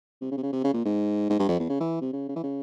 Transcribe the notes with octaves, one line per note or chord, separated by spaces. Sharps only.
C3
C#3
C3
C#3
C3
C#3
A#2
G#2
G#2
G2
F2
E2
C#3
E3
C3
C#3
C#3
E3
C#3